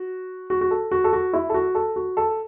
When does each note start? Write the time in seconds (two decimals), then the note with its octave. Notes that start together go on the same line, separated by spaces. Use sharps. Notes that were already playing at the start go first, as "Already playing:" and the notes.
Already playing: F#4
0.50 F#4
0.61 F#4
0.71 A4
0.91 F#4
1.04 A4
1.13 F#4
1.33 E4
1.49 A4
1.54 F#4
1.75 A4
1.96 F#4
2.17 A4